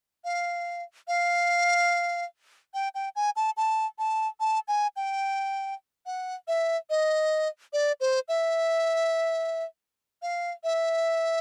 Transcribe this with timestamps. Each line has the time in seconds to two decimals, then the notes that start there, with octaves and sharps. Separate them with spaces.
0.24 F5
1.08 F5
2.74 G5
2.94 G5
3.15 G#5
3.36 A5
3.57 A5
3.98 A5
4.40 A5
4.68 G#5
4.96 G5
6.06 F#5
6.48 E5
6.90 D#5
7.73 D5
8.00 C5
8.28 E5
10.22 F5
10.64 E5